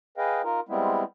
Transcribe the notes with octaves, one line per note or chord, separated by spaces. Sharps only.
G#4 B4 D#5 F5 G5
D#4 F4 A#4
G3 G#3 B3 C4 E4